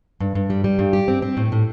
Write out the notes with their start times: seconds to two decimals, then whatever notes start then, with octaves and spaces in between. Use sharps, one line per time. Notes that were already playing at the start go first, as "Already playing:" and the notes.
0.20 G2
0.35 G2
0.50 G3
0.64 G3
0.79 G2
0.93 G4
1.08 C4
1.22 C4
1.37 A2
1.52 A2